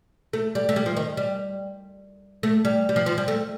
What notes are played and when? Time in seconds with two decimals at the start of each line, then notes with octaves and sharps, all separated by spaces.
0.33 A3
0.55 G3
0.69 A3
0.76 G3
0.86 F3
0.97 D#3
1.17 G3
2.43 A3
2.65 G3
2.89 G3
2.96 F3
3.06 F3
3.18 G3
3.28 A3